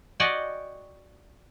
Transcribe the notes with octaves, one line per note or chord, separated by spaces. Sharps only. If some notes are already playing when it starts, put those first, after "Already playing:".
F#4 G4 D5 D#5 G5 G#5